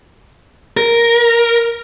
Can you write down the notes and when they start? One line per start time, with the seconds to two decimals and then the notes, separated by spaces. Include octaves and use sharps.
0.77 A#4